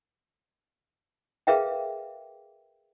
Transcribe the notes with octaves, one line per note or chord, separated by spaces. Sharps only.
G#4 A#4 B4 E5 F5 G5